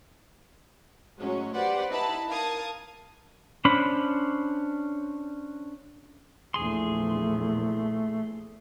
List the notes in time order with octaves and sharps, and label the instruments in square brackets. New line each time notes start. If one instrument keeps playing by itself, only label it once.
[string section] A2 F#3 G#3 C#4
G4 B4 C5 D5 F#5
D#4 E4 B4 A5 B5
A#4 F5 A5 D#6 G#6
[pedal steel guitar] C#4 D4 C5 B5
[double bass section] A#1 E2 [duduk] A3 [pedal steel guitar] G#4 C6